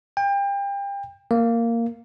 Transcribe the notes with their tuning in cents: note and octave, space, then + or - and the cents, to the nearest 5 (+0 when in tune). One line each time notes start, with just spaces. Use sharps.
G5 +30
A#3 -10